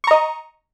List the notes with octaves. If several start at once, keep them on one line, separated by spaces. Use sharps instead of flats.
D#5 A#5 C#6